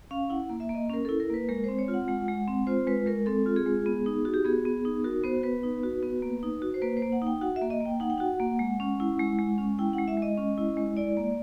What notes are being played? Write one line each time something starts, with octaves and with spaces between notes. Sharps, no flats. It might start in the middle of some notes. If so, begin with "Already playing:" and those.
C#4 F5
E4 F#5
A#3
E5
A#3
D#5
C#4 A#4
E4 A4
A#4
A#3 B4
G#3 A#4
C4 C5
C#5
F4
F#5
G#3 F#5
G#3
C4
F4 C5
G#3 B4
G#3 A#4
C4 A4
F4
G#4
G#3
B3
D#4
F#4
G4
B3 G#4
B3
D#4
F#4 A#4
B3 C5
B3 B4
D#4
F#4
B3
A#3
D#4
F#4
C5
A#3 B4
C5
A#3
F#5
D#4 G5
F#4 F#5
E5
A#3
D#5
A#3
G5
D#4 F#5
G5
F#4 F#5
A#3
G#3
C#4
E4
G#3
G#3
C#4
E4 G5
G#3 F#5
E5
G#3 D#5
C#4
E4
G#3
E4 D5
A#3